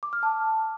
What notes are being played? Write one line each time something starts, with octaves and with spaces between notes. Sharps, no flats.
D6
F6
A5